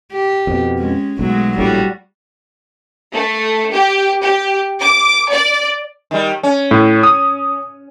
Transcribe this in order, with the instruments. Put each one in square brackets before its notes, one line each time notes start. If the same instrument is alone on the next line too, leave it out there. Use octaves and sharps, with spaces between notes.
[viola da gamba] G4
[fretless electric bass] F2 B2
[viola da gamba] G#3 C#4
[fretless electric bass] B1 [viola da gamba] F#3 G#3 A3
[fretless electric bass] A#1 A2 [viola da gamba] G3 F#4
[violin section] A3
G4
G4
D6
D5
[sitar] D#3 G3
C#4
[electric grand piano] A2
D#6